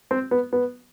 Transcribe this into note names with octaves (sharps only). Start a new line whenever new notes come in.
C4
B3
B3